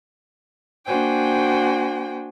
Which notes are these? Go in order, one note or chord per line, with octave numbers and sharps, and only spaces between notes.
A#3 D4 F#4 C5 G5 G#5